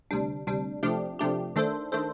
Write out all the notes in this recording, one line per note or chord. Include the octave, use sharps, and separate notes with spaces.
D2 C3 G3 D4
D2 C3 G3 D4
C3 F3 A3 D4 G4
C3 F3 A3 D4 G4
D#3 A3 D4 A4 C5
D#3 A3 D4 A4 C5